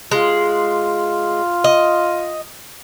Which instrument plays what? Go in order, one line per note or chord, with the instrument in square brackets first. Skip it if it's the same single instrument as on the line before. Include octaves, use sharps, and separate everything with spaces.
[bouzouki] G#3 [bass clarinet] F4
[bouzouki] D#5